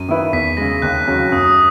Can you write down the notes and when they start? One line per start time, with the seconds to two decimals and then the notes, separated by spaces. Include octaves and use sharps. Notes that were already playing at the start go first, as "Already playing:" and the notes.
Already playing: F#2 D#7
0.08 D#3 A#3 E4 B4
0.33 E2 B6
0.57 C#3 G#3 A#6
0.82 D#2 F#6
1.07 C#3 F#3 C#4
1.32 F#2 D#6
1.45 D#6